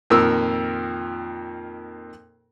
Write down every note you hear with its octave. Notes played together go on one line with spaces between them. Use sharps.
F2 A#2 D#3 A#4 E6